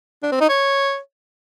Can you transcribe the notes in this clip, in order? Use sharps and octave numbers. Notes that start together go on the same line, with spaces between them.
D4
C4
D#4
C#5